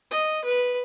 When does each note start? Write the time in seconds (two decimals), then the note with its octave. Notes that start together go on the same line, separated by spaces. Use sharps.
0.11 D#5
0.44 B4